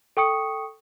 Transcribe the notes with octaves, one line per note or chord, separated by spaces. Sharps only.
A4 G5 C#6 D#6 C#7